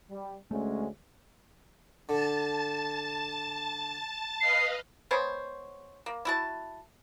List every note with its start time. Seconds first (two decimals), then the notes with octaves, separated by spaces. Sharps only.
0.11 G3
0.51 D2 G#3 A3 C#4
2.09 D3 A5 A6
4.41 B4 D#5 F5 C7
5.11 G#3 B3 C5 C#5
6.06 A#3
6.25 E4 F#4 A5